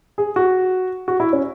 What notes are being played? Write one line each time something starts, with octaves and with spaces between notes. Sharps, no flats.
G#4
F#4
F#4
E4
C#4